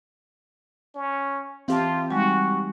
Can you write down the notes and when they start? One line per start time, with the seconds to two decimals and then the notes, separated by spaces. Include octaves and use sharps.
0.95 C#4
1.68 E3 C4 F4 G4 A5
2.11 G3 G#3 D#4 F#4